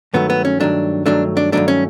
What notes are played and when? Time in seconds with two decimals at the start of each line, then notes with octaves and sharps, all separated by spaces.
0.14 G2 D#3 F#3 A3 B3
0.30 B3
0.45 C#4
0.60 G2 D#3 F#3 A3 D4
1.06 G2 D#3 F#3 A3 D4
1.37 D4
1.52 G2 D#3 F#3 A3 D4
1.68 C#4